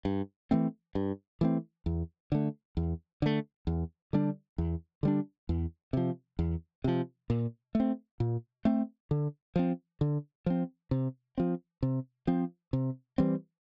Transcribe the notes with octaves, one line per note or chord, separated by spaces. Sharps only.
G2
E3 A3 C4
G2
E3 A3 C4
E2
D3 A3
E2
D3 A3
E2
D3 G3 D4
E2
D3 G3 D4
E2
C3 F3
E2
C3 F3
A#2
A3 C4
A#2
A3 C4
D3
F3 C4
D3
F3 C4
C3
F3 C4
C3
F3 C4
C3
E3 G3 C4